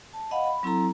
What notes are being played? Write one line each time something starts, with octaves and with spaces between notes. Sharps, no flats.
A5
D#5 F5 F#5 B5
B5
F#3 C4 E4 A4 A#5